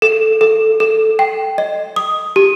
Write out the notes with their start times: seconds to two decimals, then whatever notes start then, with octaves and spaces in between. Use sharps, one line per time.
0.02 A4
0.41 A4
0.80 A4
1.19 G5
1.58 D#5
1.96 D#6
2.36 G4